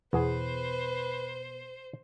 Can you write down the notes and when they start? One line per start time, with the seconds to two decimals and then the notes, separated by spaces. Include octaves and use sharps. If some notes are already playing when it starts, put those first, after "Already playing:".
0.13 E2 B2 B3 G#4 B4 C5